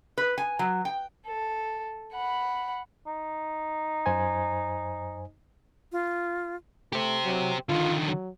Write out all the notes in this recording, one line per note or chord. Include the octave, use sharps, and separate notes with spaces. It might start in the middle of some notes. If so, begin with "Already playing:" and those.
B4
G#5
F#3
G5
A4
F#5 B5
D#4
F#2 C5 G#5
F4
A3 G4 C5
F#3
D3 D#3 F4
F#3